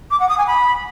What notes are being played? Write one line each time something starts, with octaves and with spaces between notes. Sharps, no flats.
D6
F#5
D#6
G#5
B5